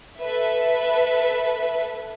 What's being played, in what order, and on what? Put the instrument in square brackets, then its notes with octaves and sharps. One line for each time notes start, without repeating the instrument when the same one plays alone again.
[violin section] A4 B4 E5